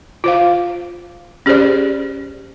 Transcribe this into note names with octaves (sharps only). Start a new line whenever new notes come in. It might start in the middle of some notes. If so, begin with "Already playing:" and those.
F4 C5 F5
C#4 G4 G#4 C5 D5